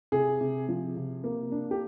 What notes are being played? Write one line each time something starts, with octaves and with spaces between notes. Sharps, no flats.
C3 G#4
C3
F3
C3
A#3
D4
G4